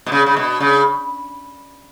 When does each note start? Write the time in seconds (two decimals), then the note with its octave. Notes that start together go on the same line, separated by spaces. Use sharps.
0.06 B2
0.12 C#3
0.26 C#3
0.37 B2
0.60 C#3